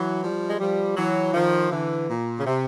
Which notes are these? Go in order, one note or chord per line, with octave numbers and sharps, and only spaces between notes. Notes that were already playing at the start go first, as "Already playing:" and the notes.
Already playing: E3 F#3
F3 G3
G#3
F3 G3
E3 F#3
D#3 F3
D3 E3
A#2
C#3
C3